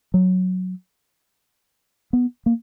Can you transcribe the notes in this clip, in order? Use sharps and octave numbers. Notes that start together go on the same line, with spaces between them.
F#3
B3
A#3